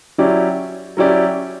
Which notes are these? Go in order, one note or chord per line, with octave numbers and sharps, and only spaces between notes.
F#3 C#4 E4 G4 D5
F#3 C#4 E4 G4 D5